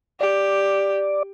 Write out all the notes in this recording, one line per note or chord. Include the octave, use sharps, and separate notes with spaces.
G4 D5